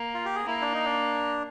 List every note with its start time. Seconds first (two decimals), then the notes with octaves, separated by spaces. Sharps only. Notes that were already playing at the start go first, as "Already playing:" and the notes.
Already playing: A#3
0.15 F4
0.25 G4
0.36 G#4
0.46 A#3 E4
0.61 D4
0.74 D#4
0.85 D4